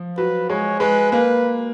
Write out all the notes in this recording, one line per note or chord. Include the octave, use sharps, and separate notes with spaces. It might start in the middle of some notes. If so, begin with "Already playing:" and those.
Already playing: F3
F#3 B4
G#3 C#5
G#3 B4
A#3 B4